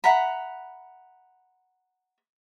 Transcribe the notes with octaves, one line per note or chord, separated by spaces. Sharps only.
E5 F#5 A#5 B5